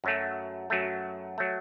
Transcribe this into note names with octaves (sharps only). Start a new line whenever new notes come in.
F#2 F#3 A3
F#2 F#3 A3
F#3 A3